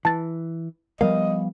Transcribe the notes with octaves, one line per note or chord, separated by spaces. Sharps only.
E3 A5 A6
F3 G3 B3 A#4 D#5 F5